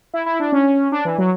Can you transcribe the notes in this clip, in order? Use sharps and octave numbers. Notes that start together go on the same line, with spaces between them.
E4
E4
D4
C#4
D4
E3
F#3